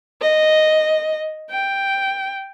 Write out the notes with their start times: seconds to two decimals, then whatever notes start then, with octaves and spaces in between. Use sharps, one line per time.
0.21 D#5
1.51 G5